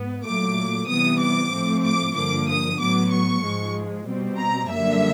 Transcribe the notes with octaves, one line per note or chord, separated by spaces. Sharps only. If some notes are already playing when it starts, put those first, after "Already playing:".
Already playing: G#2 B3
A#2 F#3 A3 D6
C3 E3 G3 B3 D#6
D6
A2 F3 A3 C4
D6
G2 D3 F3 A#3 D6
D#6
A2 F#3 B3 D6
C#6
G#2 F3 G#3
B2 G3 C4
A#5
F#2 D3 G3 A#3 E5